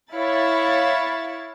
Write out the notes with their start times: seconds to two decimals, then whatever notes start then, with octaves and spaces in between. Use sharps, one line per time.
0.14 E4 C#5 F5 A6